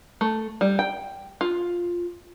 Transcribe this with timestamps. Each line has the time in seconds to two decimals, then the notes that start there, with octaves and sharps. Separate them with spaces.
0.21 A3
0.61 G3
0.79 G5
1.41 F4